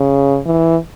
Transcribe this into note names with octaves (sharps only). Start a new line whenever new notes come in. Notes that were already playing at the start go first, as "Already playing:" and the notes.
Already playing: C#3
E3